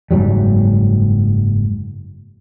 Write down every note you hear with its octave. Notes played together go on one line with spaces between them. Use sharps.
F#1 G#2 F#3 G3